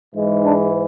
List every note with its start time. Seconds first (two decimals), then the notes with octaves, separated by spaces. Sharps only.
0.14 G#2 E3 G#3
0.44 D4